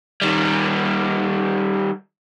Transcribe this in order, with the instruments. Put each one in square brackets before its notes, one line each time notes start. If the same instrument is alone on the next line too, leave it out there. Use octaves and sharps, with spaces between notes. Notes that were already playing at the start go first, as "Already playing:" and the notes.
[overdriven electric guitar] D#3 G3